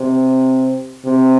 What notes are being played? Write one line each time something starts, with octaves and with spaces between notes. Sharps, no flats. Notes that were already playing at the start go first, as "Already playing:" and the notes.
Already playing: C3
C3